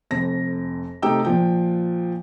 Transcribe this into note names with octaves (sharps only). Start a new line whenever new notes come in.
F1 F2 A#6
C3 A3 D#4 G4 G5 E6
A#2 F3 G5